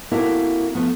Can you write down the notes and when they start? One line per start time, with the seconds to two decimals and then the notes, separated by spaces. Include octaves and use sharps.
0.11 A#3 C4 E4 F#4 A4 A#4
0.75 F3 A3 B3 F4